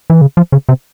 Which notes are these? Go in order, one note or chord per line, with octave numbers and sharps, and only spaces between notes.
E3
C#3
F3
C#3
C3